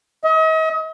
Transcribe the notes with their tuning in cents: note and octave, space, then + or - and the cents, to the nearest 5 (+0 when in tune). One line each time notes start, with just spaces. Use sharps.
D#5 +40